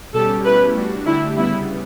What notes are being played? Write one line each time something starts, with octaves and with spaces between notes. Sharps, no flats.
B2 G3 C#4 G4 A4
B2 A3 C#4 E4 G4 B4
G3 D4 F#4
D3 A3 D4 E4 G4
C#3 G3 B3 E4